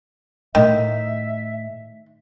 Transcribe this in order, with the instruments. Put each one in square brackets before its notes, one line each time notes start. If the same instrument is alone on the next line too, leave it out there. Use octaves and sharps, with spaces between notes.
[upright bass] A2 A3 [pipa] D#3 [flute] E5